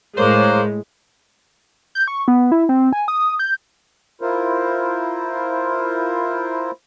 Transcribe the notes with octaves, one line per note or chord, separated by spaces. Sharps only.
A2 G#3 A#4 C5 C#5 F5 D6 F#6
G6
C#6
B3
E4
C4
G#5
D#6
G6
E4 F4 A#4 C5